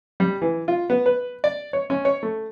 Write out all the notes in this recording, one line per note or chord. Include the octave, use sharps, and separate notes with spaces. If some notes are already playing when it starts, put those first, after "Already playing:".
G3
E3
F4
B3
B4
D5
C#5
C#4
C#5
A3